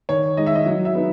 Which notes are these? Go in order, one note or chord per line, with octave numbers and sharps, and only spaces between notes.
D#3 C#5
G#3 D#4 D#5
E5
D#5
F#3
E5
B3 D#4